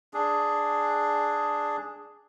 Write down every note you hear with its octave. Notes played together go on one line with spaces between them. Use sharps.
D4 G#4